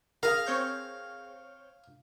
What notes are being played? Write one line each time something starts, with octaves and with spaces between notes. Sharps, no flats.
G#4 A#4 F5
C4 C#5 G6